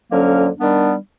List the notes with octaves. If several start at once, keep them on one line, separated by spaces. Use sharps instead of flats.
F2 D3 F#3 A#3 C#4
D#3 G3 B3 D4